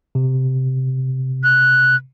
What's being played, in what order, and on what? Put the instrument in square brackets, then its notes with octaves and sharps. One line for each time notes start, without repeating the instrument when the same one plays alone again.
[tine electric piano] C3
[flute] F#6